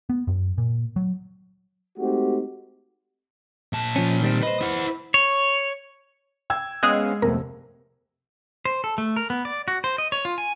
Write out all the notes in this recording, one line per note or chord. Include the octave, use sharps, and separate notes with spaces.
B3
F#2
A#2
F#3
G#3 A3 C4 D#4 F#4 G4
A#2 A5
F3 C#4
D#3 G3 C4
B4 C5 D#5
E4 F#5
C#5
G5 E6 G#6
G#3 B3 C#4 G#4 F5 F#6
C2 F2 C3 A3 B3 A#4
C5
A4
A3
A#4
B3
D5
F#4
C5
D#5
C#5
F4
G#5